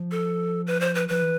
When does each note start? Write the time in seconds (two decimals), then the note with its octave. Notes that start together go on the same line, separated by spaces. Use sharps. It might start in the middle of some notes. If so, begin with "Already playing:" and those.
Already playing: F3
0.11 A4
0.67 B4
0.81 C5
0.95 B4
1.08 F3 B4
1.22 E3